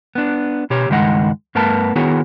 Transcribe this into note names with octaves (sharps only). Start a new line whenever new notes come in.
B3 D4
B2 G4 C#5
C#2 G2 D#3 G#3 D#5 F#5
G2 A3 B3 A#4 B4 A5
D#3 B3 E4 F#4 G#4 C#5